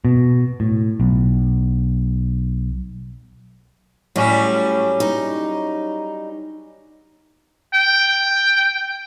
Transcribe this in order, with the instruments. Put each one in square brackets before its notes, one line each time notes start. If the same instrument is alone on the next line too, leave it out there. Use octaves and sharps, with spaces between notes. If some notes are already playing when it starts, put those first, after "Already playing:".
[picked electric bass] B2
A2
B1
[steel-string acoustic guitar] A2 [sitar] F#3 G3 C#4
[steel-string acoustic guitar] D#4
[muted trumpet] G5